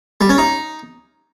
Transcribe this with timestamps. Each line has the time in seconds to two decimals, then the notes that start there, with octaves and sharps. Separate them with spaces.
0.21 G3
0.29 C#4
0.38 D#4